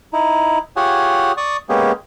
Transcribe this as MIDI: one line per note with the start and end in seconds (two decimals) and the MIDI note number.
0.13 0.58 63
0.13 0.58 64
0.76 1.32 65
0.76 1.32 67
0.76 1.32 68
0.76 1.32 73
0.76 1.32 78
0.76 1.32 80
1.37 1.57 74
1.37 1.57 85
1.37 1.57 87
1.69 1.92 56
1.69 1.92 58
1.69 1.92 59
1.69 1.92 61
1.69 1.92 67
1.69 1.92 68